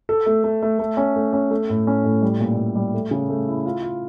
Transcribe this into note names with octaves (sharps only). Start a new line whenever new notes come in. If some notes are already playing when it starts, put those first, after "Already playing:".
A4
A3
A3
A3
A3
C#4
A3
C#4
A3
A2
C#4
A2
G3
A#2
A#2
G3
A3
C#3
A3
E4
F4
F4